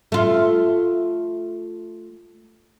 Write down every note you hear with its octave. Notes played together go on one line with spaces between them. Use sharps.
A3 F4